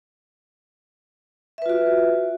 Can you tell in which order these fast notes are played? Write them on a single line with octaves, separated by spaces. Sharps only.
E5 B4 F4 F#4